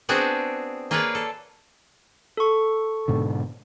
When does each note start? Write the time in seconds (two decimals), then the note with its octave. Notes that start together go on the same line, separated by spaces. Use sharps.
0.09 B3 C4 D4 F#4 G#4 D5
0.91 A#3 F4 G#4 B4 C#5 D5
1.15 A4
2.37 A4 C#6
3.08 G#2 B2 D3